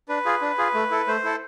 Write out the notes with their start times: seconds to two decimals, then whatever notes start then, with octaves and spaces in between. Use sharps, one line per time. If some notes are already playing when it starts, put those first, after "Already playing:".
0.09 D4 B4
0.26 F4 G#4
0.42 D4
0.58 F4 G#4
0.74 A3
0.91 E4 A4
1.07 A3 C5
1.24 E4 A4